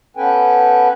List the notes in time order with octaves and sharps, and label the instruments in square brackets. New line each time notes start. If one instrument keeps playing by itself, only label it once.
[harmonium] B3 C#4 A4 B4 G5 G#5